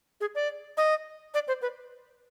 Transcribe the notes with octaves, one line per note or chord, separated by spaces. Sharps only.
G#4
D5
D#5
D5
C5
B4